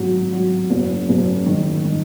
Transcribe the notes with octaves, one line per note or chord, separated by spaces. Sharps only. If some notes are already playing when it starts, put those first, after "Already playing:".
Already playing: G#1 F#3
F#3
F#1
F#1
D#3
D#3